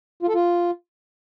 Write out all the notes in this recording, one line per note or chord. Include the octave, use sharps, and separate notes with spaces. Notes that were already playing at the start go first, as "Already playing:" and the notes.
F4
A4
F4